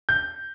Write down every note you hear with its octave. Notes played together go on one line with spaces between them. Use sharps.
G6